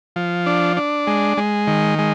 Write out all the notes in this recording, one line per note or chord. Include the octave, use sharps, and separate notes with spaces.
F3
D4
D4
G#3
G#3
D#3
G#3